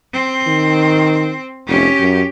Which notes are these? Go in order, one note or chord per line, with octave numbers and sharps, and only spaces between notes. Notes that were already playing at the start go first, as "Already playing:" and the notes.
C4
D#3
F1 C#4 G4
F#2